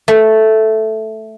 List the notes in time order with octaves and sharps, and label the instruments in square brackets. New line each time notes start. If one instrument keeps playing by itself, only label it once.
[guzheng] A3